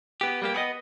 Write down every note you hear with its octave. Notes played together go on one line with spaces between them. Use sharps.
B3 G4
G3 A#3 G4
B3 G#4 D#5